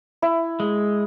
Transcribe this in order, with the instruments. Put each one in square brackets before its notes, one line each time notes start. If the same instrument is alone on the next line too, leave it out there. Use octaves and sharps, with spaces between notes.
[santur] E4
[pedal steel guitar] G#3